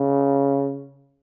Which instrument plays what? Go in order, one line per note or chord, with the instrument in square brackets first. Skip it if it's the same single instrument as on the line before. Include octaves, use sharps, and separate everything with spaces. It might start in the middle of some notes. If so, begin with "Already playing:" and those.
Already playing: [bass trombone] C#3